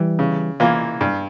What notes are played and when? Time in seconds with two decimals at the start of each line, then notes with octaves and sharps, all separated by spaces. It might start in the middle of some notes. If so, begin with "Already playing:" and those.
Already playing: E3 G3
0.19 C#3
0.60 E3 A#3 F4
1.01 G2